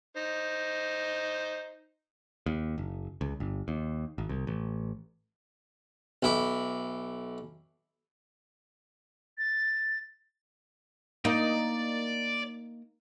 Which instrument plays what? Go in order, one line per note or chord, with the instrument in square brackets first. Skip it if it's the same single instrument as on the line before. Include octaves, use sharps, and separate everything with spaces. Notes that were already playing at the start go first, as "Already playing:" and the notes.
[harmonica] D#4 C5
[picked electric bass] D#2
F#1
C#2
G1
D#2
G#1
C2
A1
[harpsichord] B1 E4 D6
[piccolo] A6
[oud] A#3 D#4 [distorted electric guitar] D5